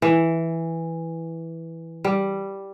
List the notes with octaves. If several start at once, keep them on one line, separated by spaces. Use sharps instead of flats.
E3
G3